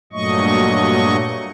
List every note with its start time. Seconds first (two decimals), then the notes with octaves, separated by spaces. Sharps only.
0.13 G2 A#2 F#3 A3 D#5 C#6